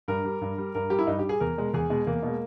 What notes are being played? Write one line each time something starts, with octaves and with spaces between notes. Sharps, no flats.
G2 A#4
G3
G2
G3
G2 A#4
G3 G4
E4
G2 D#4
G3 G4
G#4
E2 A#4
B2 G#3
E2 G#4
B2 G#3
E2 A#3
B2 G#3